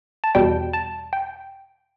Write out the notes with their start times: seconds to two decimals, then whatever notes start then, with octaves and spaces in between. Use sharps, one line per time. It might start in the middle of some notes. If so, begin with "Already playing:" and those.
0.24 A5
0.35 E2 B2 G3 G5
0.73 A5
1.13 G5